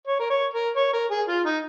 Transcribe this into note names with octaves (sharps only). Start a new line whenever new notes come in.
C#5
A#4
C#5
A#4
C#5
A#4
G#4
F4
D#4